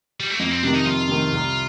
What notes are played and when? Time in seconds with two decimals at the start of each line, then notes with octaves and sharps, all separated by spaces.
0.20 G3
0.30 A3
0.39 F2 A#3
0.51 C4
0.63 C3 D#3 D4
0.75 D#4
0.86 F2 F4
1.09 C3 D#3
1.32 C2